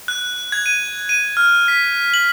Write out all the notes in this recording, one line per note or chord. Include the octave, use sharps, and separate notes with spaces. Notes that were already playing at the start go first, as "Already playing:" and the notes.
F#6
G#6
D#7
D#7
F6
B6
F#7